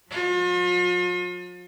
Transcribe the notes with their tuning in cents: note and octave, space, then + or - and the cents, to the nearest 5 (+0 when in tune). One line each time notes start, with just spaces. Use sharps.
F3 +45 F4 +40